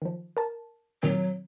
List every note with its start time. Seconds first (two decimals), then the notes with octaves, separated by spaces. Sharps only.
0.02 D#3 F3
0.37 A#4 A5
1.03 A#2 D#3 F#3 C4